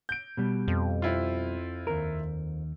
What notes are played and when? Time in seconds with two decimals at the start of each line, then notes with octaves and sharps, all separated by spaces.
0.09 G6 D7
0.37 B2 G3
0.68 F2
1.02 C4 E4 F4
1.87 D#2 A#4